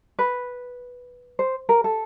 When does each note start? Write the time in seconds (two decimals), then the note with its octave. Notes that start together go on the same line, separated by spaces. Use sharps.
0.19 B4
1.39 C5
1.69 A#4
1.84 A4